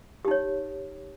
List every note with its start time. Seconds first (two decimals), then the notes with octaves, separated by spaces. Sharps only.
0.25 G4
0.28 D#4
0.31 C#5